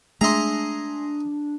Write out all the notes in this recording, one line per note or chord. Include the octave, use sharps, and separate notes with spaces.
G#3 A3 D4 G#4 D#5 E5 A#5 C6